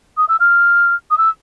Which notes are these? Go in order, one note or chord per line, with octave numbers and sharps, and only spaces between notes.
D#6
E6
F6
D#6
E6